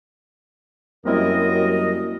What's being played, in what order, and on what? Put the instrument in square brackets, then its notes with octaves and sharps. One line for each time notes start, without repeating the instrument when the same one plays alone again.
[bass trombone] F#2 [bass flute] G3 [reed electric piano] A#3 C4 E4 [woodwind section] A#4 D#5